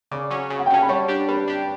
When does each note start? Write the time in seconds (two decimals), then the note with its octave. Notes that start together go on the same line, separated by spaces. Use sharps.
0.11 C#3 D5 D6
0.31 F#3 C#4
0.50 C#3
0.59 F#5
0.66 G5
0.70 F#3 C#4 A5
0.82 B5
0.89 G3 C#5 C#6
1.08 D4 G4
1.28 G3 B4 B5
1.48 D4 G4